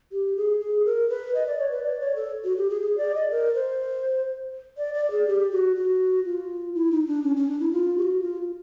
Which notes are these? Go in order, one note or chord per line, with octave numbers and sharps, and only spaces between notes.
G4
G#4
G#4
A#4
B4
D#5
D5
C#5
B4
D5
C#5
A4
F#4
G4
G#4
G#4
D5
D#5
A#4
C5
D5
D5
G#4
G4
F#4
F#4
F4
E4
D#4
D4
C#4
C#4
D4
E4
F4
G4
F#4
F4